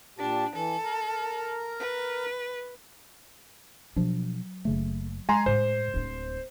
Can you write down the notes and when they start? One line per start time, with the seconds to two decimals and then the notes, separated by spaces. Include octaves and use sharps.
0.18 A#2 D4 G4 A5
0.54 E3 A4
0.84 A#4 A#5
1.80 B4
3.96 B2 F3 F#3 D4
4.65 F#1 C#3 A3
5.29 G#3 G#5 A#5 C6
5.46 A2 C5
5.94 D1 D4